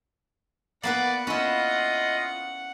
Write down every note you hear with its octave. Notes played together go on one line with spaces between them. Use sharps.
A#3 B3 B4 D5 F#5
C#4 E4 F4 D#5